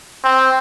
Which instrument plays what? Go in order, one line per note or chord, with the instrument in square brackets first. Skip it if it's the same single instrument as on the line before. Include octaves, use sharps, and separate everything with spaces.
[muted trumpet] C4